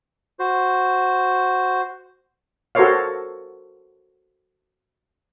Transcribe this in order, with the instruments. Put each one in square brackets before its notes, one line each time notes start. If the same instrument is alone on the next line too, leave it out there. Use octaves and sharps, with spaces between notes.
[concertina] F#4 C5
[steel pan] F#4 A4 A#4 C5 C#5 F5